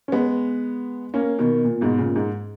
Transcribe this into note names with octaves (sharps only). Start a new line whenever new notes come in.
C#4
G#3 B3
A#3 C#4
B2 D#3
A#2
G#2 B2
A#2 C#3
G#2